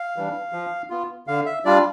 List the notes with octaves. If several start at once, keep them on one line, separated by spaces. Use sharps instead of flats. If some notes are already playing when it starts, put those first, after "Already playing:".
Already playing: F5
E3 G3 D4
F3
B3 F4
D3 F5
E5
G3 D4 F4 D5